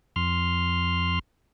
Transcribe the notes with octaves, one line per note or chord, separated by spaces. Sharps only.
F2 C6 F6